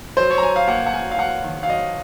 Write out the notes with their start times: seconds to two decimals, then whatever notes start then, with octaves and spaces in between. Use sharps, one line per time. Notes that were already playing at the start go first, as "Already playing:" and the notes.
0.17 F#3 C5
0.30 C#5
0.38 A#5
0.43 F#3 G#5
0.56 F5
0.68 A#3 F#5
0.86 F#5
0.94 A#3 G#5
1.11 F5
1.18 A#3 F#5
1.44 D#3
1.63 F5
1.69 F#3 D#5